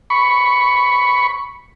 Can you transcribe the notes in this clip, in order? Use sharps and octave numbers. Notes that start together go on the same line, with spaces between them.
B5 C#6